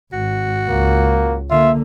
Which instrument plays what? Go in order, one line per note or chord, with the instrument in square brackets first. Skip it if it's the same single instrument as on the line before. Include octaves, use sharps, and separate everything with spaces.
[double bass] G#1 [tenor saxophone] F#4
[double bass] C#2 [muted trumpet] A#3
[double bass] D3 A#3 [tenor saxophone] F4 [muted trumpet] E5